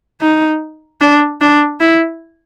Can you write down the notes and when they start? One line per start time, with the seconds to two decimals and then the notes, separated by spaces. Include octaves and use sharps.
0.21 D#4
1.01 D4
1.41 D4
1.80 E4